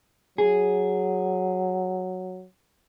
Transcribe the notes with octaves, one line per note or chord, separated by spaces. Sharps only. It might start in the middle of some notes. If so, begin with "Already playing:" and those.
F#3 G#4